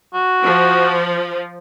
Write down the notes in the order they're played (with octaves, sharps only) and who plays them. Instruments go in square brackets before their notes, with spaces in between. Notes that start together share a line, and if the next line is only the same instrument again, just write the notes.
[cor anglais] F#4
[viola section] F3